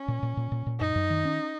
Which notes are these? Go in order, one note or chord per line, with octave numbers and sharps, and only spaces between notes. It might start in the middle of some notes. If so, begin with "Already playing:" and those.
Already playing: C#4
A#2
A#2
A#2
A#2
A#2
F#2 D#4
F#2
D#3
C#4